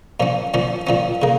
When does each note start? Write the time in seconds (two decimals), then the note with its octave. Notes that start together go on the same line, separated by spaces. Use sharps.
0.20 A#2 F3 C#4
0.54 A#2 F3 C#4
0.87 A#2 F3 C#4
1.22 C#3 A#3